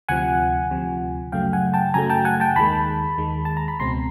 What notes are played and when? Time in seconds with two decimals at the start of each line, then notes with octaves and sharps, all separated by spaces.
0.09 D2 C3 F3 F#5 G#5
0.71 D2 C3 F3
1.32 F#2 C#3 F#3 A3 F5 G5
1.53 F#5 G#5
1.74 G5 A5
1.94 F#2 C#3 F#3 A3 G#5 A#5
2.10 G5 A5
2.25 F#5 G#5
2.40 G5 A5
2.56 D#2 D#3 G#3 A5 B5
3.18 D#2 D#3 G#3
3.45 A5
3.57 A#5
3.68 B5
3.80 C#2 B2 G#3 C4 A#5 C6